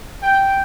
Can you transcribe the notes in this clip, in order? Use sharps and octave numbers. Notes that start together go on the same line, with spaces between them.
G5